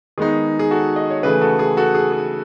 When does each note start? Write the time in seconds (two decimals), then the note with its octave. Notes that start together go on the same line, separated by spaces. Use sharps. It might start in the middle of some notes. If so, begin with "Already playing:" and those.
0.18 D#3 G#3 B3 D#4 G#4
0.59 G#4
0.71 F#4 A4
0.96 D#5
1.10 C#5
1.23 C#3 E3 A3 G#4 B4
1.41 F#4 A4
1.59 G#4
1.77 F#4 A4
1.95 G#4
2.12 G#4